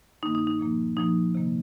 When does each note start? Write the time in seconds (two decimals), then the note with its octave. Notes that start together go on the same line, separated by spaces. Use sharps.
0.23 G2 D#3 A#3 D#4
0.35 D#4
0.47 D#4
0.59 A#2 F3 A#3
0.97 A#2 F3 A#3 D#4
1.35 C3 D#3 A#3